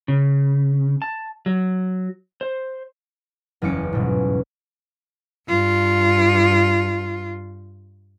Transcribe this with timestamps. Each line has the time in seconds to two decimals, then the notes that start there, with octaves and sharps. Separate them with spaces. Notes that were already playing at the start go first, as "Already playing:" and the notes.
0.08 C#3
1.02 A5
1.46 F#3
2.41 C5
3.62 F#1 E2 C#4 D6 C#7
3.93 G1 G#2 B2
5.48 G2 F4